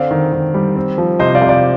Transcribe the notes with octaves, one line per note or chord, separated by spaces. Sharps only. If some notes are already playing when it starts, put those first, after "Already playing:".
Already playing: D3 C4 D5 F5
D#3
D#3
G3
C4
F3
C3 C5 D#5
D5 F5
C3
D5 F5